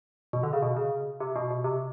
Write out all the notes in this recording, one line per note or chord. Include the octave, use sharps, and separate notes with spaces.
B2
D3
C#3
B2
C#3
C3
B2
B2
C3